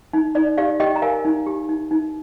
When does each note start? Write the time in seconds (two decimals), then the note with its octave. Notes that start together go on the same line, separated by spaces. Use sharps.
0.13 D#4
0.35 D#4 D5
0.57 G4 D5 F5
0.80 G4 D#5 G5
0.96 A#5
1.02 A#4 F5 G#5
1.25 D#4
1.47 G4
1.69 D#4
1.91 D#4